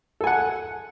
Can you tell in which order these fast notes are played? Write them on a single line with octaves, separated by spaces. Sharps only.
A4 G#5 F#5